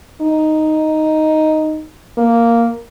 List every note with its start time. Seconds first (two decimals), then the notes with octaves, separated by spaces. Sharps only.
0.21 D#4
2.18 A#3